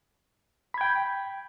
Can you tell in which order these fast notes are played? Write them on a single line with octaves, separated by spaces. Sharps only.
B5 G#6 G5